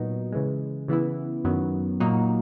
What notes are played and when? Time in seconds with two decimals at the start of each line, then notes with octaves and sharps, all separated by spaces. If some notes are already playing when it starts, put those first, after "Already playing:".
Already playing: A#2 F#3 B3 D#4 F#4
0.32 C#3 E3 G#3
0.88 C#3 E3 B3 E4
1.44 F#2 D#3 F#3 B3
2.00 A#2 F#3 A#3 D#4 F#4